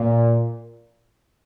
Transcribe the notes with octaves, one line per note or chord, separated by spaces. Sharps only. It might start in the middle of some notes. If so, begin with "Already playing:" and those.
Already playing: A#2